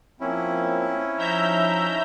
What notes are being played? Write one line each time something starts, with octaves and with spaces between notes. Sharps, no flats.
F3 A#3 C4 C#4 E4
F3 D#4 E5 A#5 G6